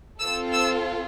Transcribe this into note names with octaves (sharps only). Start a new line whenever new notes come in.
C4 F4 A4 E6
E6